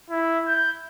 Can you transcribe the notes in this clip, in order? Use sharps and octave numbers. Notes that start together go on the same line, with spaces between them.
E4
G6